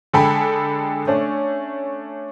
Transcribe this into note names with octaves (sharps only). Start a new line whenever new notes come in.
D3 G#3 A4 G5 G#5 B5
A3 C#4 D4